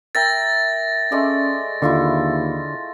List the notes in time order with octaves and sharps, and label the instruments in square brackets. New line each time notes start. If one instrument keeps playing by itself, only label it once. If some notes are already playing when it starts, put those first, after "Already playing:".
[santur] A#4 E5 G5 [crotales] A6 A#6
[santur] G#3 A3 D5 [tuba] C#4
[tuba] D#2 [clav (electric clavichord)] D3 [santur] E4 F4 C#6